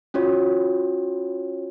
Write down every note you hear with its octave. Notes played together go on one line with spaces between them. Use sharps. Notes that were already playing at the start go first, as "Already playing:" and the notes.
C#4 F4 F#4 C#5